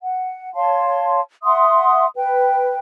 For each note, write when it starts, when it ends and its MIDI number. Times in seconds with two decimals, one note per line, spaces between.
0.02 0.54 78
0.55 1.20 73
0.55 1.20 77
0.55 1.20 81
0.55 1.20 84
1.43 2.06 76
1.43 2.06 78
1.43 2.06 84
1.43 2.06 87
2.15 2.79 71
2.15 2.79 79